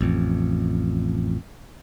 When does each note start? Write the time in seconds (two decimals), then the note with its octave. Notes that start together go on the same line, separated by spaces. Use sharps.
0.01 A1 F2